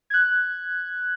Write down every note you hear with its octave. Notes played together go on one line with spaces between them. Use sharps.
F#6 G#6